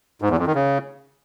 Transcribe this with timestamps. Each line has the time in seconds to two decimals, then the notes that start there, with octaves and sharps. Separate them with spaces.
0.22 G#2
0.30 E2
0.38 F2
0.46 D#3
0.55 C#3